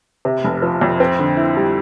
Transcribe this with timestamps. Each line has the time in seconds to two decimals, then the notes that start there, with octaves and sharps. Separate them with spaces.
0.25 C3
0.44 F1
0.62 F3
0.81 F2
1.00 C4
1.19 D3
1.37 E4
1.57 G3